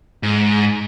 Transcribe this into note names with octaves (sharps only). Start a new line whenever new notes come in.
G#2